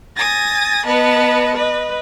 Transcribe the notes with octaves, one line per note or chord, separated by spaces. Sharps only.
G#5 D#6 A6 A#6
B3 B4 D#5 A5
B4 D#5